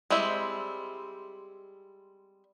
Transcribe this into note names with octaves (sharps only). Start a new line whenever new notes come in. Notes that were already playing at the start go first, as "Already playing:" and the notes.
G3 G#3 C4 E4 E5